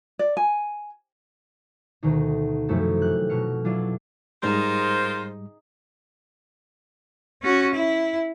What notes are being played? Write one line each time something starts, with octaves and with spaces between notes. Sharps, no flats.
D5
G#5
D2 B2 D#3 D#4
F#2 C3 F3 A3 E4
G4 F#6
B2 F#3 F6 C#7
F#3 D4 E4 F4
G#2 G3 D#4 F4 G#4 A#4 C5
C#4 F#4
E4